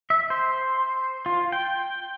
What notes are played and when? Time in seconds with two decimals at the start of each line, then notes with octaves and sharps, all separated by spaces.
0.10 E5
0.30 C5
1.26 F4
1.52 G5